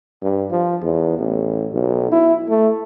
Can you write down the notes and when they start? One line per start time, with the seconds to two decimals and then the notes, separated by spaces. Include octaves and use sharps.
0.22 G2
0.51 F3
0.82 E2
1.19 A1
1.73 B1
2.12 E4
2.49 A3